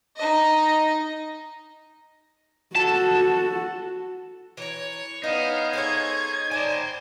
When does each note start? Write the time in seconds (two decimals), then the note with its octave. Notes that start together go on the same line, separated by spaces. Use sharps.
0.17 D#4 D#5
2.76 F#4 A4 A5
4.57 E3 C#5 A#5
5.24 B3 C#4 D#4 D#5 F5
5.73 G#4 A4 C5 C#5 G#6
6.51 A#4 C5 D5 G#5 A5